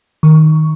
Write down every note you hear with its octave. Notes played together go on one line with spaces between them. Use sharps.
D#3 C#6